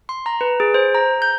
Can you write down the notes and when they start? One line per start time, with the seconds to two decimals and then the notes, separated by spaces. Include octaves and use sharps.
0.09 C6
0.26 A#5
0.41 B4
0.60 G#4
0.74 C5
0.95 A#5
1.22 G6